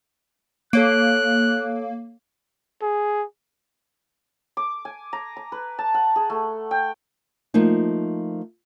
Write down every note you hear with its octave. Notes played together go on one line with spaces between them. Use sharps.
A#3 A4 C#5 F#6 D7
G#4
D6
G#5
A#5
A#5
B4
A5
F#5
G#4
A3
G5
F3 A3 A#3 D#4